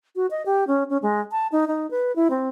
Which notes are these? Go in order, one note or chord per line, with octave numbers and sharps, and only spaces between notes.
F#4
D#5
G4
C#4
C#4
G#3
A5
D#4
D#4
B4
E4
C4